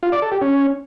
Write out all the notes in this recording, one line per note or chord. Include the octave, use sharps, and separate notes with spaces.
F4
D5
A4
G4
C#4